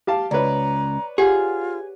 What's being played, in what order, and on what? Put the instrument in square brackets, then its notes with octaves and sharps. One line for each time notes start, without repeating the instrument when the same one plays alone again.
[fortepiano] G4 F5 A5
[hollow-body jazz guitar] C#2 [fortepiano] B4 C#5 D5 [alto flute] A#5
[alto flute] F4 [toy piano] G4 F#5 [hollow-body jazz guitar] G#4